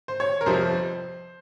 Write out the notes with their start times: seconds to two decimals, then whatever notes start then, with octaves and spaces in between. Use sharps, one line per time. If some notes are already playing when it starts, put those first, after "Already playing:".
0.08 C5
0.20 C#5
0.41 A#4
0.46 G1 F2 C3 F3 C5